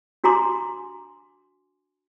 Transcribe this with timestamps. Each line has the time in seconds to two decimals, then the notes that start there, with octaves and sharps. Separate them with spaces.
0.24 D4 F#4 G#5 A#5 C6 D6